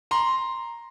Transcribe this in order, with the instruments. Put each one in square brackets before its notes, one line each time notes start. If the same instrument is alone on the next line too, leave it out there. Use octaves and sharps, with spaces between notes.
[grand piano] A#5 C6